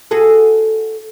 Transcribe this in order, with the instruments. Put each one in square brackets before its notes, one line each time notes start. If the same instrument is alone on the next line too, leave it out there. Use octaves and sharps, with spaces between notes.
[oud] F#4 G#4 A4